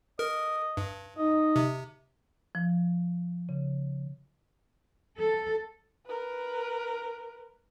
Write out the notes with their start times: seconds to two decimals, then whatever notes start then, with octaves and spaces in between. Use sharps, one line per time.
0.19 A#4 D#5
0.77 G2
1.18 D#4 D#5
1.56 C3
2.55 F3
3.49 C#3
5.18 A4
6.07 A#4 B4